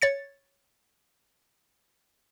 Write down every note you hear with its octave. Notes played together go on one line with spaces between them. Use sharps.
C#5 A6 C#7